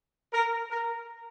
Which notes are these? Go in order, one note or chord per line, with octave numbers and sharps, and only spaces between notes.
A#4
A#4